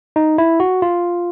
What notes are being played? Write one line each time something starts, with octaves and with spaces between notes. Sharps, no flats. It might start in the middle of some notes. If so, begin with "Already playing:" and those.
D#4
E4
F#4
F4